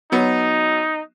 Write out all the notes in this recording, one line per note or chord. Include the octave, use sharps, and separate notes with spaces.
F#3 B3 D#4